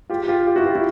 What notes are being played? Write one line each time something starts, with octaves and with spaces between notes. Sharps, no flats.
F4 G4
F4 G4
F4 G4
E4 F#4
F4 G4
E4 F#4